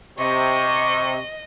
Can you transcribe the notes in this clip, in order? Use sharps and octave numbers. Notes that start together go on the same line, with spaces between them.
C3 D#5 C#6